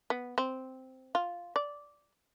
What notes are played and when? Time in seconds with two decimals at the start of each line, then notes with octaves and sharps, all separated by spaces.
0.10 B3
0.38 C4
1.15 F4
1.56 D5